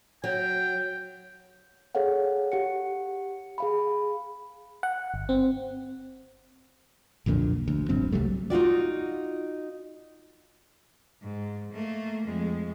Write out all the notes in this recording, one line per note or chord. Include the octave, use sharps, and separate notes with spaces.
F#3 G5
G#4 A4 C#5 F5 F#5
G4 F#5 C#7
G#4 F5 B5
F#5
G1
C4
B1 F2 A#2 D3
D2
D#1 A#1 G2 C4
C2 F#3 G3 A3
D#4 F4 F#4 D5
G#2
A3 A#3
F2 G#3